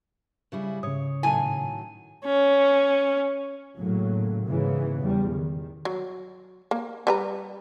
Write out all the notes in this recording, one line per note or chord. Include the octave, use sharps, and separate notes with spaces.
C#3 G3 E4
G#2 C#3 C#5 D#6
A2 D#3 F#3 E4 G#5 A5 D#7
C#4
A2 C#3 F#3 A#3
G#2 C#3 E3 B3
E2 G3
D#3
F#3
A#3
G3 B4 A#5